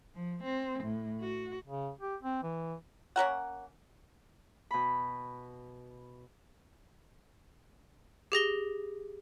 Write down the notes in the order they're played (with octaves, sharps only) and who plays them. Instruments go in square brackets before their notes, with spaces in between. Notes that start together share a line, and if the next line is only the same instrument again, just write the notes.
[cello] F3
C4
A2
F#4
[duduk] C#3
G4
C4
E3
[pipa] A#3 C#4 A#4 F#5
[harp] B2 B5
[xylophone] G4 G#4 A#6 G7